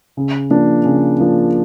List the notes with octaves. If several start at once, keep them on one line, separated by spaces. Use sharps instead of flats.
C#3
F3 A#3 D4
C#3
F3 A#3 D4